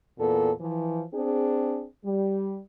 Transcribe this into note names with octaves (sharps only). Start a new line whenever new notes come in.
E2 A#2 B3 A4
E3 F3
C4 D4 G#4
G3